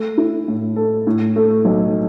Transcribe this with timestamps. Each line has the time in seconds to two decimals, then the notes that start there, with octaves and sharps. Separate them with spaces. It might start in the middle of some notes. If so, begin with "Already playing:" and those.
Already playing: A3
0.18 E4
0.48 A2
0.76 A4
1.07 A2
1.36 A3
1.65 B1